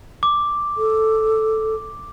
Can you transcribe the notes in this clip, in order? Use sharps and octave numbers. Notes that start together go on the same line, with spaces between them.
D6
A4